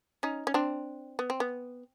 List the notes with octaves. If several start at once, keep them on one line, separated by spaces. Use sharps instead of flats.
C#4 D#4
C#4
C4 D4
B3
C4
B3